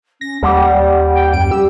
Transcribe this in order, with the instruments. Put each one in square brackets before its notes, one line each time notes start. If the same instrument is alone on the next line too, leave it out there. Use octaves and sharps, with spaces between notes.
[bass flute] C#4 [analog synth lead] A#6
[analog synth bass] D#2 [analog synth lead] G3 [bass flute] F#5
[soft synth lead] G5
[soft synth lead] F#2 [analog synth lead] D7
[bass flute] G3 [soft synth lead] G4 [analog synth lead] E6